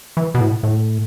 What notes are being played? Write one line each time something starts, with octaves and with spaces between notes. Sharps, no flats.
E3
B2
A2
A2